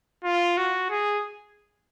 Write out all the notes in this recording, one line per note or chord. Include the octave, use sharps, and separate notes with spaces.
F4
F#4
G#4